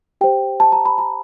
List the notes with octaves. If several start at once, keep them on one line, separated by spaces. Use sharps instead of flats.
G4 C5 G5
A5
A#5
B5
A#5